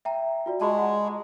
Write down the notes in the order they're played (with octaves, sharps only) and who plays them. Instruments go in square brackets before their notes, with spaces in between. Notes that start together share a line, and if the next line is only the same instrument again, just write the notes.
[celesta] E5 G5 A#5
F4 F#4 D5
[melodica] G#3 [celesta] A5 B5 C#6
[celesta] F#5 A#5